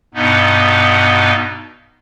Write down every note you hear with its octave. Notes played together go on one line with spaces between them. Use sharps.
G2 B2 B3 D#4